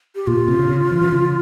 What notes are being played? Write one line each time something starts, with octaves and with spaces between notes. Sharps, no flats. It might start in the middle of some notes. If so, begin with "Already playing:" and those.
G4
A#2 F4
A#2
C3
C#3
C#3
E3
E3
C#3